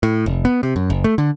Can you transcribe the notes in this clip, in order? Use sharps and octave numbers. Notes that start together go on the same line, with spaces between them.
A2
F1
B3
C3
F#2
F#1
A3
D3